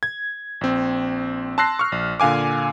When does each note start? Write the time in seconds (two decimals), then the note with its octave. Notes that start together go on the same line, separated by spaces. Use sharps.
0.03 G#6
0.61 A#1 C4
1.58 A5 C6 E6 F#6 A#6 C7
1.79 C#6 F6
1.92 A#1
2.20 A#2 D3 F5 G#5 D6